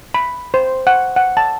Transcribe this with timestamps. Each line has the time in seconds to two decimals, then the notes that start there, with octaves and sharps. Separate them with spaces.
0.14 B5
0.54 C5
0.87 F#5
1.16 F#5
1.37 A5